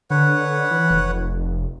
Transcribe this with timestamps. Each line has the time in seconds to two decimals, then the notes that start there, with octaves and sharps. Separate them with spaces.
0.10 D3 B4 C#5 F#5
0.71 E3
0.90 F1